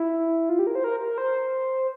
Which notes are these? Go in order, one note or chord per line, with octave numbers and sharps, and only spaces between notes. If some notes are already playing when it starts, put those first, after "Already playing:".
Already playing: E4
F4
G4
A#4
C5
A#4
A#4
C5